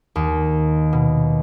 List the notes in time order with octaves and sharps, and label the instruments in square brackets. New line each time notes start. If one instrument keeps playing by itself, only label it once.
[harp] D#2
B2